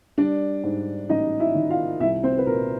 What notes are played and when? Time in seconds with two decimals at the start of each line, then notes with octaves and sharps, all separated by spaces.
0.18 G3 D4 D5
0.64 G#2
1.09 A1 D#4 D#5
1.40 E4 E5
1.55 D#3
1.70 F4 F5
2.00 C2 E4 E5
2.23 C4 C5
2.38 B4
2.46 A#2 A#4